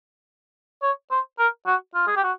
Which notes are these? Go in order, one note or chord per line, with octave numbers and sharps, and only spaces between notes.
C#5
C5
A#4
F#4
F4
G#4
G4
F#4